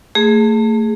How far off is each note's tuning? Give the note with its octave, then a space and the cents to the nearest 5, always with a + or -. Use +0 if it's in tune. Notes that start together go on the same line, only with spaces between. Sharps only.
A3 +30 G#4 +0